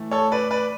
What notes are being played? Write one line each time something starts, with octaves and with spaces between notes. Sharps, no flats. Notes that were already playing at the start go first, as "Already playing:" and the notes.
Already playing: A2 E3 A3
A4 C#5
B4 D5
B4 D5